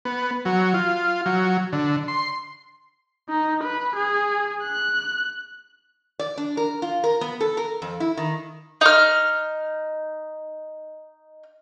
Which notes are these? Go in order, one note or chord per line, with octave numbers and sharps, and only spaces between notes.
B3
F#3
F4
F#3
D3
C6
D#4
B4
G#4
F#6
D5
D4
A#4
F4
A#4
B3
A4
A#4
F2
E4
D#3
D#4 F6